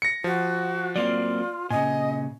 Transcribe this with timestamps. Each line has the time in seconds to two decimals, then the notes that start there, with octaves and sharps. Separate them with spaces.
0.02 A#6 C#7
0.24 F3 F#4
0.96 F#3 A#3 C4 F4 D5
1.70 A#2 C#3 D#5 G#5